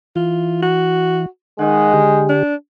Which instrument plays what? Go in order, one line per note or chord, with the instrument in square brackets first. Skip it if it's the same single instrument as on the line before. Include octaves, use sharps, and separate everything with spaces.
[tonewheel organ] E3 [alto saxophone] F4
[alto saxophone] F#4
[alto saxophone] D#3 [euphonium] G#3 [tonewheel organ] F#5
[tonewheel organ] D3 G4
[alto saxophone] D4